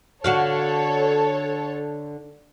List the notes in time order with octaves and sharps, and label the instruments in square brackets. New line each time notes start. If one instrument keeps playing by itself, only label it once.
[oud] D3 F#4 F5 [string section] A4 C#5